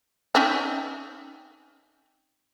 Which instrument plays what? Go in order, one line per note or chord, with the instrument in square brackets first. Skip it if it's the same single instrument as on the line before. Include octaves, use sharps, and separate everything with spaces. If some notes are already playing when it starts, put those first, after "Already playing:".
[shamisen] C4 C#4 D#4